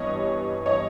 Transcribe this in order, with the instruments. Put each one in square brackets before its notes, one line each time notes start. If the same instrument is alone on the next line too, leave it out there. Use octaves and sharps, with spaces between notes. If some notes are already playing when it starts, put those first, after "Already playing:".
Already playing: [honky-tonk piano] G2 E3 G3 B3 C#5 D#5
C#5 D#5